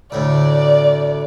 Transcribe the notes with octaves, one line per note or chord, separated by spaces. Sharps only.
D2 A2 D5